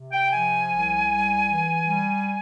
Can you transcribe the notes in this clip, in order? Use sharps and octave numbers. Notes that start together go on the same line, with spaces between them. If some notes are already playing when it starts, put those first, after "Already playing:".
Already playing: C3
G5
F3 G#5
C2
G3
E3
G3